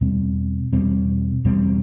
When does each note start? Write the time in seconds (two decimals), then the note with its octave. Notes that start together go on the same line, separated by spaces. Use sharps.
0.01 E2 B2 G3 C4
0.72 E2 B2 G3 C4
1.45 E2 B2 G3 C4